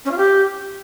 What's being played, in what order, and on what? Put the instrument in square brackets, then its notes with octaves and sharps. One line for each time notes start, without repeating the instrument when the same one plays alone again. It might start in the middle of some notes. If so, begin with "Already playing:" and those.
[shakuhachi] C#4
F4
G4